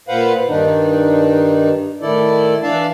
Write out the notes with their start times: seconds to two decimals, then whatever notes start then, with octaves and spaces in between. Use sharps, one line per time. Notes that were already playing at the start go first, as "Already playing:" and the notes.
0.09 A#2 B4 C5 F5 F#5
0.48 G2 D#3 D4 D#4
2.02 A2 D#3 E4 A4 D5
2.63 E3 D4 D5 E5 F5 A5